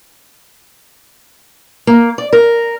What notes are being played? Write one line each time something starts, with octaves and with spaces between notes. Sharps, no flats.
A#3
D5
A#4